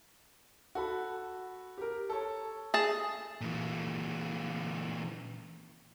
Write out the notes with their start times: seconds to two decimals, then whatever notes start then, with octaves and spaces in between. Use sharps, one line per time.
0.75 F#4 A4 B5
1.78 G4 A#4
2.10 A4 C#5
2.74 G#4 A5
3.41 A#2 E3